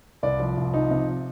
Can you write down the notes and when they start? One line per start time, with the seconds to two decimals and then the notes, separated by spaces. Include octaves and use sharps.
0.23 C2 D5
0.40 F3
0.57 C2
0.74 F3 D#4
0.91 C3